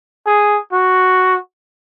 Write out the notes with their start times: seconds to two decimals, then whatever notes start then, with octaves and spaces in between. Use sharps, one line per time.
0.26 G#4
0.72 F#4